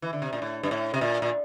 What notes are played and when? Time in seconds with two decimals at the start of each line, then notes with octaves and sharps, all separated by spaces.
0.02 E3
0.13 D3
0.22 C3
0.33 A#2
0.42 A2
0.63 G2
0.71 A2
0.94 C3
1.01 A#2
1.22 A#2